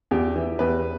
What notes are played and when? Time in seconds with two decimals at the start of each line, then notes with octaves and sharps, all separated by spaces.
0.11 E2 G4
0.36 E3
0.59 E2 B4